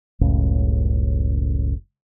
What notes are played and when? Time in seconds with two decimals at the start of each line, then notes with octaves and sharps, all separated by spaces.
0.21 F#1 C#2 A2 C#3